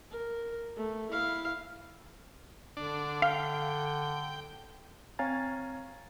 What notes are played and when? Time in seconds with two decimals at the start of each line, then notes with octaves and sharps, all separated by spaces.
0.11 A#4
0.77 A3
1.11 E4 F5
2.77 D3 D4
3.22 F5 G5
5.19 C4 C#5 F5 G#5 A#5 A6